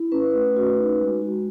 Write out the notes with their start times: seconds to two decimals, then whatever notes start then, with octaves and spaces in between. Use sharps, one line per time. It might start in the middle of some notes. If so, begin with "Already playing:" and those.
Already playing: E4
0.12 C#4 B4
0.34 A3
0.56 F#4
0.77 D#4
1.00 G#3
1.22 F#4